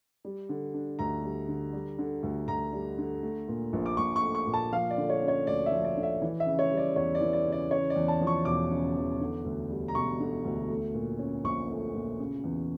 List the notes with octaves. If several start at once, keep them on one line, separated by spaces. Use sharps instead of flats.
G3
D3
D4
D2 A#5
G3
D3
G3
D3
D2
D2 A#5
G3
D3
A3
A#2
A#1
D6
A#1 C#6
C#6
A3
C#6
A#2
A5
F3 F5
D5
D3
C#5
C#4
C#5
D2 D5
E5
F3
D5
D3
E5
E3
E5
C#3
C#5
G3
D5
E2 C#5
D5
E3
D5
C#3
D5
C#3 C#5
D5
E2
A5
F3
C#6
E1 D6
C#3
E2
D3
D2
G3
A#5
E1 C#6
D3
D2
A3
A#2
C#4
A#1 C#6
A3
A#2
C#3
E2